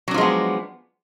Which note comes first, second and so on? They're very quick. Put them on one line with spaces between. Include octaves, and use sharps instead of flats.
F#3 D4 F3 G#3 B3